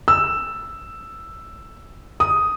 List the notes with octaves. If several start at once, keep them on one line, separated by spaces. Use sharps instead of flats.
E6
D#6